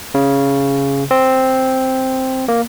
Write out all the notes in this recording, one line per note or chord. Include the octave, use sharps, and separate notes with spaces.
C#3
C4
A#3